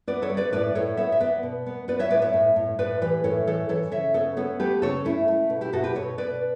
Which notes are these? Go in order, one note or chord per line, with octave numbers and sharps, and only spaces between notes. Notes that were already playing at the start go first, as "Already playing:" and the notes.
B3 B4 D5
A4 C#5
G3
B4 D5
A2 B4 D5
A2 A4 C#5
B3 C#5 E5
E5
B3 B4 D5
B2
B3
B3 B4 D5
C#5 E5
A2 B4 D5
C#5 E5
A2
A2
A2 B4 D5
E3 G4 B4
A2 A4 C#5
E3 A4 C#5
E3 A4 C#5
C#3 C#5 E5
B3 A4 C#5
B3 A4 C#5
A3 G4 B4
C#3 A4 C#5
A3 C#4 E4
A3
B2
E4 G4
B2 F#4 A4
G4 B4
B2 A4 C#5
B2 B4 D5